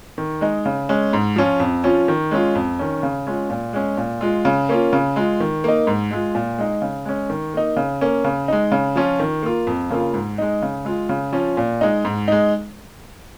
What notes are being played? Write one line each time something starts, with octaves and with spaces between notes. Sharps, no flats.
D#3
G#3 D#4
C#3
G#3 C#4
G#2
F3 C#4 F4
F2
F3 C#4 F4
D#3
G#3 C#4 F4
F2
D#3 C#4
C#3
G#3 C#4 F4
A#2
G#3 C#4
A#2
G#3 F4
C#3
A#3 C#4 F4
C#3
G#3 F4
D#3
A#3 D#4
G#2
G#3 F4
A#2
G#3 D#4
C#3
G#3 C#4
D#3
A#3 D#4
C#3
A#3 C#4
C#3
G#3 D#4
C#3
F3 C#4 F4
D#3
A#3 F4
F2
C#3 A#3 F4
G#2
G#3 D#4
C#3
G#3 F4
C#3
F3 C#4 F4
A#2
G#3 D#4
G#2
G#3 D#4